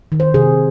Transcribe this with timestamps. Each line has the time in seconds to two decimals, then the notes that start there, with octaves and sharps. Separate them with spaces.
0.12 D#3
0.20 C5
0.34 C3 G#4